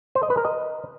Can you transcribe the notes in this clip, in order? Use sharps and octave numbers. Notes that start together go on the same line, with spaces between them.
C5
D#5
B4
A#4
D#5